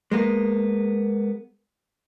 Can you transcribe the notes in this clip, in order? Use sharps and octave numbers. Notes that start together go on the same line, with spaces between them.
G#3 A#3 B3